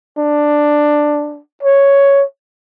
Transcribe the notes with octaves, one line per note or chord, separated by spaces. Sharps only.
D4
C#5